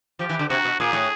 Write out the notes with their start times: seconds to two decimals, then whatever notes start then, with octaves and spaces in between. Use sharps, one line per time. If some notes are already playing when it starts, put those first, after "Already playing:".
0.19 F3 G4
0.29 E3
0.39 D3
0.49 C3 F#4
0.65 B2
0.80 A#2 G#4
0.93 A2